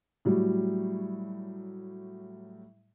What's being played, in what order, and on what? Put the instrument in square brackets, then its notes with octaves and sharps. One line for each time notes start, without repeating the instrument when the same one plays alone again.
[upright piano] A2 F#3 G3